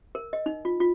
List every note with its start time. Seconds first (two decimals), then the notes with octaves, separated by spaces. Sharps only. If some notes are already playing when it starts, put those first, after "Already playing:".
0.15 A#4
0.33 D#5
0.46 D#4
0.65 F4
0.80 F4